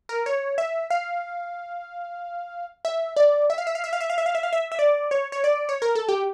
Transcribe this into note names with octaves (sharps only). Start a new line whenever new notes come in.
A#4
C#5
E5
F5
E5
D5
E5
F5
E5
F5
E5
F5
E5
F5
E5
F5
E5
F5
E5
E5
D5
C#5
C#5
D5
C#5
A#4
A4
G4